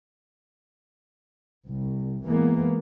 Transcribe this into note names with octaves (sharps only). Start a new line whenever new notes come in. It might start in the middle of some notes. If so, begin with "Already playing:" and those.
C2
E3 G#3 A#3 B3